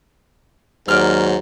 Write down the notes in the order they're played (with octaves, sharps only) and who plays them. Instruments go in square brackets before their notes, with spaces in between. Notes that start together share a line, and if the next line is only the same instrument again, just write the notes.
[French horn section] D#2 F#3 [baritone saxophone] G#2 [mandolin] D5 F6